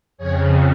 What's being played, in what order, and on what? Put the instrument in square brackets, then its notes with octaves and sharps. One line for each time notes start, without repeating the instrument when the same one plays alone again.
[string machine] F2 C#3 G#4 C#5